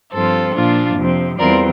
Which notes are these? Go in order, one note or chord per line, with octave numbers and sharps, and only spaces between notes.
G2 F3 C4 F4 A4 C5
A#2 F3 A#3 D4 F4
F2 C3 F3 C4
E2 E3 G3 C4 F4 A#4 D5